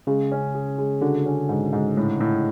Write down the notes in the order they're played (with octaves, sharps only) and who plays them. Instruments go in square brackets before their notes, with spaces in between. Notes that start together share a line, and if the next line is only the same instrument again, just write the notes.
[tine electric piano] C#3 [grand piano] G#3
[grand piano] C#4
G#4
G#3
[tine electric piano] D3 [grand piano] F#4
[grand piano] C#4
G#2
G#2
A2
A2